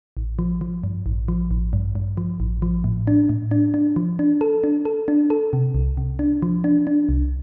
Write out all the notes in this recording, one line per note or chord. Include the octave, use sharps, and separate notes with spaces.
A1
F3
F3
G2
A1
F3
A1
G2
G2
F3
A1
F3
A2
D4
A2
D4
D4
F3
D4
A4
D4
A4
D4
A4
C3
C2
C3
D4
F3
D4
D4
C2